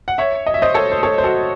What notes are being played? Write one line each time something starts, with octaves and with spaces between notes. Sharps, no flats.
F#5
C#5 E5
D#5
E5
C5 D#5
A4 C#5
C5
A4 C#5
C5
F#4 A4